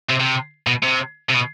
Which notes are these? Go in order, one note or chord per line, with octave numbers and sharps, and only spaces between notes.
C3
C3
B2
C3
C3
B2